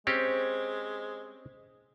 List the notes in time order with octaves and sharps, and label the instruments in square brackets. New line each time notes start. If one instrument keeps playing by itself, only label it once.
[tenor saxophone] G#3 [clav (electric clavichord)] C4 C#4 G4 [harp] C5